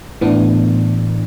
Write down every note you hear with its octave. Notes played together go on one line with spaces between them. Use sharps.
A2 E3 B3 D4